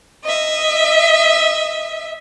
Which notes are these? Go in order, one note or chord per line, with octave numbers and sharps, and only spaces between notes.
D#5 E5